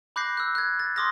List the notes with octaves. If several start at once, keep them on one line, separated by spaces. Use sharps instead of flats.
B5 D6 F#6 G6 A#6 C7
E6 F#6
F#6 G#6
A6
C6 D6 D#6 F6 A#6